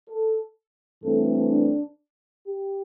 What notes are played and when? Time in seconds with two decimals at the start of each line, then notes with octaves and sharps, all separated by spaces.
0.09 A4
1.03 G2 E3 A3 C4 A4
1.51 D4
2.47 G4